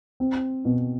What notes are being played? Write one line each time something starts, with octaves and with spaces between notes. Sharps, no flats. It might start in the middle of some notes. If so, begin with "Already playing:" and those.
C4
B2